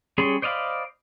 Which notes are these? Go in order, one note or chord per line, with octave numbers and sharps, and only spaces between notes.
G3 C#4 G#4 C#5 C6
C5 D5 D#5 F5 B5